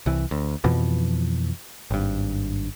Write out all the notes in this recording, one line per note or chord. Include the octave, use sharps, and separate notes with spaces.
C2 E3
D2
F2 B2 E3 F3
G#1 G2